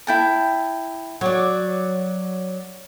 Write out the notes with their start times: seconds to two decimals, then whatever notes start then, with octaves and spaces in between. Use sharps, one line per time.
0.07 E4 G5 A5
1.21 F#3 C#5 D5